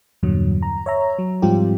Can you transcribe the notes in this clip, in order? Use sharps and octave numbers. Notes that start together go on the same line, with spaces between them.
E2 G2 A#2 D3 F#3
A#5
C#5 E5 A#5
F#3
G#2 F3 G3 C4 F4 G4